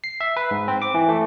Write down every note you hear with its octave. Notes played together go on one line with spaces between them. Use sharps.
C7
E5
B4
G#2
C4
D6
E3
A3